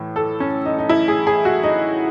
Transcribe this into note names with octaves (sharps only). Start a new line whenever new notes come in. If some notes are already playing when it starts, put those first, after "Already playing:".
Already playing: A2 E3
A4
C#4
D#4
D#4
E4
G#4
G#4
F#4
D#4